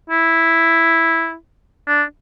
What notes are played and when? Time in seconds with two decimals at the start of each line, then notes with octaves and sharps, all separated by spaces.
0.10 E4
1.87 D4